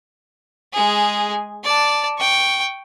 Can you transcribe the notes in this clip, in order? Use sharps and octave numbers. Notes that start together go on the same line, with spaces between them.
G#3 G#4
D5 A5
G5 C#6